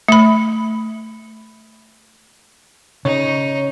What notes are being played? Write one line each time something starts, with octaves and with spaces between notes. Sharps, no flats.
A3 B5
C#3 D#4 C#5